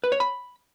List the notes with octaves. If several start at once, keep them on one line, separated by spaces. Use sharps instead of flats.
B4
C#5
B5